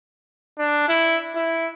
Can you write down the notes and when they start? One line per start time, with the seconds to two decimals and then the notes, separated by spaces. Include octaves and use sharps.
0.59 D4
0.88 E4
1.35 E4